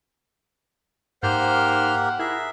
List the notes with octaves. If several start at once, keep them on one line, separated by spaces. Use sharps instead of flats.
G#2 A#3 G4 A#4 C5 F#5 F6 G6
E4 G#4 A#4 E5